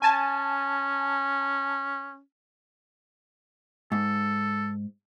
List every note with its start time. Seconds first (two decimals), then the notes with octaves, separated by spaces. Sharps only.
0.02 C#4 G#5 A5
3.92 G#2 A4